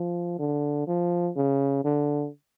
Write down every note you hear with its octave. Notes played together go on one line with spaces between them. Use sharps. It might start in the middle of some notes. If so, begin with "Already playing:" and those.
Already playing: F3
D3
F3
C#3
D3